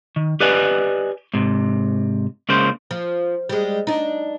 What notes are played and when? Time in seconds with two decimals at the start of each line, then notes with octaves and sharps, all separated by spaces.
0.16 D#3
0.40 G4 B4 D5 D#5 G#5
1.34 G#2 C3
2.49 C#2 C#3 A#3 C5
2.91 F3
3.49 G3 G#3
3.87 D4 D#4